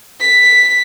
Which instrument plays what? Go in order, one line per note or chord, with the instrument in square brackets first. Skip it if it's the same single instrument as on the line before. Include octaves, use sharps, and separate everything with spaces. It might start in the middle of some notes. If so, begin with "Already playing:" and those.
[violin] B6